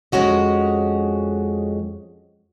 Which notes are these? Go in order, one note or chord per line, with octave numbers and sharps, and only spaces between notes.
F2 G#3 C#4 F#4 D#5